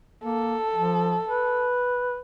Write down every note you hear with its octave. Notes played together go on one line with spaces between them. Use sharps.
A#3 A4
F3
B4